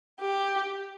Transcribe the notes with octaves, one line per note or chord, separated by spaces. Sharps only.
G4